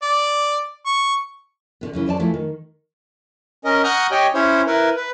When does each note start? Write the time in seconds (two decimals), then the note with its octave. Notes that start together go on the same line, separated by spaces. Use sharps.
0.02 D5
0.86 C#6
1.81 D3 D#3 B3
1.93 F#2 C#3 E3
2.06 F#2 C5 D5 A5
2.20 E3 F3 A3 E4
2.34 D#3
3.65 C#4 A#4 D#5
3.84 F#5 A#5 C#6 D#6 F6 G6
4.11 G4 C#5 D#5 G5 G#5
4.34 C#4 E4 C5 C#5
4.67 E4 A#4 B4
4.97 B4